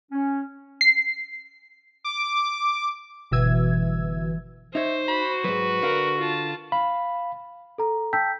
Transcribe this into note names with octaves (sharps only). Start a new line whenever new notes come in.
C#4
C7
D6
G1 B2 E3 E6 G#6
D#4 C5 C#5 E5
F#4 B5
G#2 F#3 B4
D3 A#4 F5
F4 A5
F5 B5
A4 A#5
G5 A5 E6 G6 B6